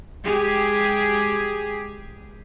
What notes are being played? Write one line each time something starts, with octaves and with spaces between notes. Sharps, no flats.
G#3 G4 G#4